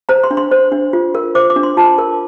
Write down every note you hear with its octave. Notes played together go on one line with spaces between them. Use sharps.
C5 A#5
C6
D4
C6
C5
D4
F4
A#4
C5 D6
D6
D4
C6
F4 A5
A#4